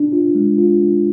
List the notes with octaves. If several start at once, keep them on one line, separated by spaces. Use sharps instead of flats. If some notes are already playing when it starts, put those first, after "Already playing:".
Already playing: D4
F4
G#3
F4
D4